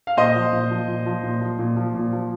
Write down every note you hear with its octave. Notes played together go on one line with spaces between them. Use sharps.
F5
A#2 C5 D#5
F3
A#2
F3
A#2
F3
A#2
F3
A#2
F3
A#2
F3